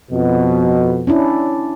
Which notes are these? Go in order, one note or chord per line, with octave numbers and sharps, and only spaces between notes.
F2 B2
C#4 D4 E4